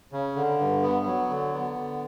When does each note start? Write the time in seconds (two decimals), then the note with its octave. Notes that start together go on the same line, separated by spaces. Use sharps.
0.12 C#3
0.36 D3
0.58 G2
0.82 B3
1.06 F#3
1.29 D3
1.54 B3
1.78 D3